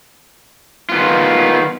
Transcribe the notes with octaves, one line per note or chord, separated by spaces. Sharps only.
D#3 B3 F4